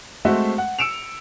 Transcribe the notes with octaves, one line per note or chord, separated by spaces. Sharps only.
G#3 A3 C4 F#4 C5 E5
F#5
E6 C#7 D7 E7 F7